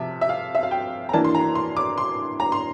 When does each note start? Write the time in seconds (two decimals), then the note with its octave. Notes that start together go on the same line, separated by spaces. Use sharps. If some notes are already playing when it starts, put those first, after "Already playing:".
Already playing: C3 F3 E5
0.21 E5
0.29 F5
0.55 E5
0.63 F5
0.71 G5
1.09 A#5
1.13 E3 A#3 D4 A5
1.24 C6
1.35 A#5
1.55 C6
1.77 D6
1.98 C6
2.40 A#5
2.52 C6